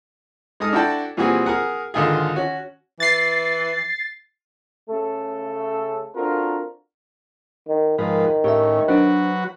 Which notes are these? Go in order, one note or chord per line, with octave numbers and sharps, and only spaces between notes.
G#3 D#4 A4 D#6 F6
D4 E4 F#4 A4 G5 A5
A#2 E3 G3 C4 F#4 G#4
G#4 A#4 F#5
G#1 D3 D#3 F4 G#4
C#4 F#4
E3 A6 C7
C#3 A3 A4
C4 D4 F4 F#4 A4 A#4
D#3
G#2 D#3 F3 A#4 B4
A2 C#4 G4 A#4 E5
F#3 D4 F#4 B4 C5